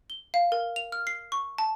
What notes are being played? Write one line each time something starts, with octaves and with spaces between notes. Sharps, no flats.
G7
F5
A#4
F7
F6
C7
C#6
A5